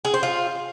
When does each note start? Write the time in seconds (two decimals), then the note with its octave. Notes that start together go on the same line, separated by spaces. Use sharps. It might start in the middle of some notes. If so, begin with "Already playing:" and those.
0.05 G#4
0.14 C5
0.23 F4